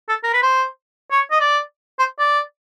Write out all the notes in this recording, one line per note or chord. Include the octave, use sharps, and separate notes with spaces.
A4
A#4
B4
C5
C#5
D#5
D5
C5
D5